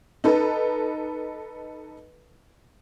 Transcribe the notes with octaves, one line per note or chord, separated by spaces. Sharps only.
D#4 A4 B4